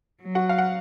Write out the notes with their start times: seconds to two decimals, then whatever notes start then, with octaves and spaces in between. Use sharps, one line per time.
0.21 F#3
0.35 F#4 F#5
0.49 F5
0.58 F#5